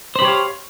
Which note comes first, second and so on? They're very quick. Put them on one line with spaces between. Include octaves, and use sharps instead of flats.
C5 B5 G4 C#5 F5